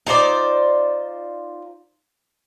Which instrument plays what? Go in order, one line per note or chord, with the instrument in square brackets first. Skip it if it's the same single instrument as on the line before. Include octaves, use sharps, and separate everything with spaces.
[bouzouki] D#4 F4 C5 D5